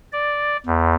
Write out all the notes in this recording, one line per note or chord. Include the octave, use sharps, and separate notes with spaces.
D5
E2